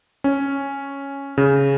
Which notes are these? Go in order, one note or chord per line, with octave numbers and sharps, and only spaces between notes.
C#4
C#3